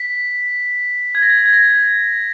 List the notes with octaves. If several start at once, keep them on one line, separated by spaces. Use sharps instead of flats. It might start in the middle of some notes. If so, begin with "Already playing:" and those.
Already playing: B6
G#6
A#6
G#6
A#6
G#6
A#6